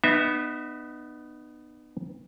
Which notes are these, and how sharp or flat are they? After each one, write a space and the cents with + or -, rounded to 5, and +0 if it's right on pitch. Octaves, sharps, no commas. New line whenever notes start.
B3 +0 D#4 -40 E5 -15